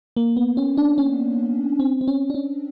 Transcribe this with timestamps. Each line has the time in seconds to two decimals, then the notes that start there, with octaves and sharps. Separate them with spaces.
0.17 A#3
0.37 B3
0.57 C#4
0.77 D4
0.98 C#4
1.80 C4
2.01 C4
2.08 C#4
2.30 D4
2.34 C#4